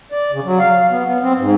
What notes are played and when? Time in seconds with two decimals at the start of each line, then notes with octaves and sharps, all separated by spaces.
0.12 D5
0.32 C#3
0.45 F#3
0.59 F5
0.90 B3
1.05 B3
1.22 C4
1.38 G#2